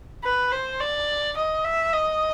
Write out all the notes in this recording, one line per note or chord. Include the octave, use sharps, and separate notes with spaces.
B4
C5
D5
D#5
E5
D#5